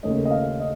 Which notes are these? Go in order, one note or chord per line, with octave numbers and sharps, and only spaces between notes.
D#2 C#3 A3 C#4 D#5
D#5
F5
D#5